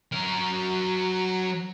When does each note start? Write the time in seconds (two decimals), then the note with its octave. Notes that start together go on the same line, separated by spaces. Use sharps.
0.12 F#3 A#4